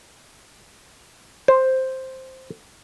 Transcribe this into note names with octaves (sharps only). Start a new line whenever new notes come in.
C5